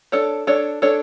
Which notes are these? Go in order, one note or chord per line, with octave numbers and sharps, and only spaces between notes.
D4 A4 C#5
D4 A4 C#5
D4 A4 C#5